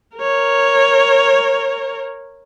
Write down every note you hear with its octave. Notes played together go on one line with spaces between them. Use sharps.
A#4 C#5